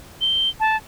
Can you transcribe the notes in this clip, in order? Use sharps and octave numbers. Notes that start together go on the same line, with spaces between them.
G7
A5